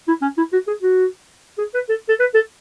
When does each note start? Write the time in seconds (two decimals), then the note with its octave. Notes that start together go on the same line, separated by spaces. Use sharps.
0.08 E4
0.22 C#4
0.37 E4
0.53 F#4
0.67 G#4
0.82 F#4
1.58 G#4
1.74 B4
1.89 A4
2.09 A4
2.20 B4
2.34 A4